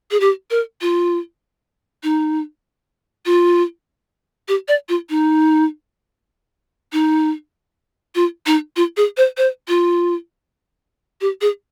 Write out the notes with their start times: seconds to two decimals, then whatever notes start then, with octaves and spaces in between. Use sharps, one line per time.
0.11 G#4
0.20 G4
0.50 A#4
0.81 F4
2.03 D#4
3.26 F4
4.48 G4
4.68 D5
4.89 F4
5.10 D#4
6.93 D#4
8.15 F4
8.46 D#4
8.76 F4
8.97 G#4
9.17 C5
9.37 C5
9.68 F4
11.21 G4
11.41 G#4